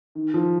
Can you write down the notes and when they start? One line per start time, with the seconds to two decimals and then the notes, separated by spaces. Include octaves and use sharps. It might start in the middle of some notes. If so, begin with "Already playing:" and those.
0.15 D#3
0.34 F3